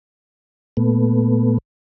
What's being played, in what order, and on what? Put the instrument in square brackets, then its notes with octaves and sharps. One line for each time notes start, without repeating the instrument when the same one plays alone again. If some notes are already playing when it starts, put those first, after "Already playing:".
[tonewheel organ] A#2 A3 B3